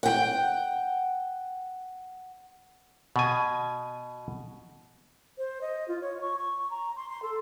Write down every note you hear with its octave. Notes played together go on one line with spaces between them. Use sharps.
F#5 G5
B2 G#5
C5
D#5
F4
C#5
C#6
C#6
A#5
C6
C6
A4